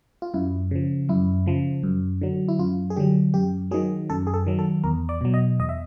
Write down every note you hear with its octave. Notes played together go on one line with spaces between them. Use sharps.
F4
F#2 E4
C#3 F3
F#2 E4
C#3 F3
F#2
D3 F#3
E4
F#2 F4
G#4
D3 F#3 G4
F#2 G4
D#3 F#3 G#4
F#2 A4
G#4
A4
D#3 F#3
A4
E2 A#4
D5
B2 F#3
D#5
E2 D#5
E5